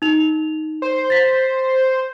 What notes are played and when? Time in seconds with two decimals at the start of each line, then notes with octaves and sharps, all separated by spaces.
0.02 D#4 F7
0.82 C5
1.10 A6 B6